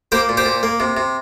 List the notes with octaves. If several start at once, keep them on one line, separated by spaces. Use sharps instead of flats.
A#3 G4 C5
A#2
G4 C5
A#2
A#3
C3
C3